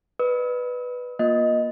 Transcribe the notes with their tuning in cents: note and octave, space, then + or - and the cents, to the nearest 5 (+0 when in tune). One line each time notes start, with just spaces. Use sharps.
B4 +0 D5 +45 E6 -45
A#3 +20 F4 +20 D#5 +0